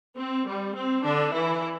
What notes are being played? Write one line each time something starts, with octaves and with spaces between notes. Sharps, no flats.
C4
G3
C4
D3 D4
E3 E4